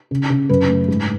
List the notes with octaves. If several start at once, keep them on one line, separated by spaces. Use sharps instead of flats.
C#3
C#3
F#2 B4
A3
G#2